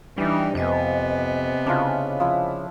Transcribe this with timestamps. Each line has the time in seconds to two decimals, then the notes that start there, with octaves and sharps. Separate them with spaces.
0.18 E3 G3 D4 D#4 D#6
0.55 F2 C3 B3 C5 D#5 G#5
1.66 C#3 D4 E4 F4
2.20 F3 E4